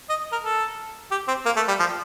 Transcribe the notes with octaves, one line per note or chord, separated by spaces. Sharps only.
D#5
A#4
A4
G4
C4
A#3
A3
G3
F3